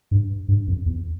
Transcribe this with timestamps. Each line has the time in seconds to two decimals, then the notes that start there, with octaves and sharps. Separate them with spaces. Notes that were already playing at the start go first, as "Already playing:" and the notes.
0.11 G2
0.48 G2
0.68 F2
0.86 E2